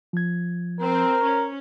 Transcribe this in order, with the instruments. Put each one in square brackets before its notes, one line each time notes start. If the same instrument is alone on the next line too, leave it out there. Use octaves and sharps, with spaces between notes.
[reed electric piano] F3 G#6
[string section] C4 C5 [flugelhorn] A#4
[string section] C#4